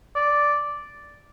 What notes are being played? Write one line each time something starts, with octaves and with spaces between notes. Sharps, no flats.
D5